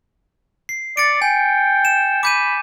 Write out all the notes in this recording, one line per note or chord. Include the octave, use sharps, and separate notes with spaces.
C7
D5 A6 C#7 D7
G5 G#5
E7
B5 D6 G6 D#7